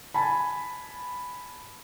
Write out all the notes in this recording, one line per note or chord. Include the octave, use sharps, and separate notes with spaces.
G#5 A5 B5